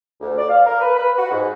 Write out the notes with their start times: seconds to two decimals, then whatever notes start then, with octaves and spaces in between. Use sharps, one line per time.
0.21 D2
0.38 D5
0.50 F5
0.66 A#4
0.81 B4
0.97 B4
1.17 F#4
1.31 G#2